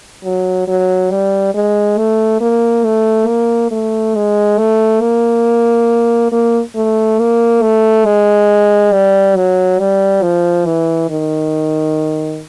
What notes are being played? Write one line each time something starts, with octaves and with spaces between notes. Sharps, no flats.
F#3
F#3
G3
G#3
A3
A#3
A3
A#3
A3
G#3
A3
A#3
A#3
A3
A#3
A3
G#3
G3
F#3
G3
F3
E3
D#3